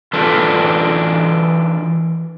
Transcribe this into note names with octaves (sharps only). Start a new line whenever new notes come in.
E3 D4 F4 A4 B4